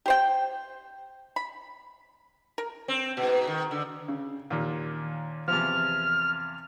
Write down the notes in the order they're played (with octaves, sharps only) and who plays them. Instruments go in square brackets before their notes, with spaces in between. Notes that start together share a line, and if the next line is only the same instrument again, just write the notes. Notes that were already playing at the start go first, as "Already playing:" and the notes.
[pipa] G4 C5 G5
B5
A#4
[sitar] C4
G#2 B2
D#3
D3
[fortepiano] C#3
D#2 A#2
[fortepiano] E2 C3 F3 [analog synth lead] F6